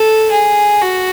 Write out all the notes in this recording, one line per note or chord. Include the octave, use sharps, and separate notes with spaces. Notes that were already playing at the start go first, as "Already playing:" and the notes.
Already playing: A4
G#4
F#4